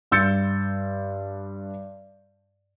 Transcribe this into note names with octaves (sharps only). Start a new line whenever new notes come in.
G2 C6 E6 G6 A6 C#7